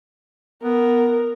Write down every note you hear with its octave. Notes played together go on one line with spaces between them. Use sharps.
B3 A#4